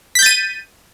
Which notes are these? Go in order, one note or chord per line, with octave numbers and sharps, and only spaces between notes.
G6 A6 B6 D#7